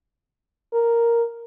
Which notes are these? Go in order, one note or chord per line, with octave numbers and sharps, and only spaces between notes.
A#4